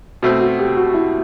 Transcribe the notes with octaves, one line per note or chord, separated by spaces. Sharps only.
B2 A3 C4 F#4
F#4
G4
F#4
E4